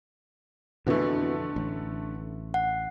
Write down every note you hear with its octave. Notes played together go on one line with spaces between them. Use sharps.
F2 B2 D3 E3 A3
A1
F#5